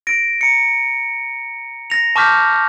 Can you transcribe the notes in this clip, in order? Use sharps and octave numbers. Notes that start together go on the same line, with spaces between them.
A#6 D7
A#5 C#7
A#6 F7
A5 C#6 D6 F6 G6 B6